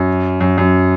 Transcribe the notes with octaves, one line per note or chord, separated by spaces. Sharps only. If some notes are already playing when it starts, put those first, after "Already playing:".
Already playing: F#2
F#2
F#2